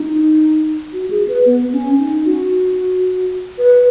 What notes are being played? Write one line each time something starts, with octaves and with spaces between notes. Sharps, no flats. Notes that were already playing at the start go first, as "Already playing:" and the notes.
Already playing: D#4
F#4
G#4
B4
B3
C#4
D#4
F#4
B4